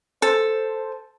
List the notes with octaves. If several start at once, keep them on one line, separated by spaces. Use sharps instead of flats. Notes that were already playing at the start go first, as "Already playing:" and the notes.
A4 C5